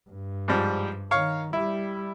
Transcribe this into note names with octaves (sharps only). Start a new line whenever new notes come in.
G2
G#2 F3 G3
D#3 C#5 F5 C#6
G3 E4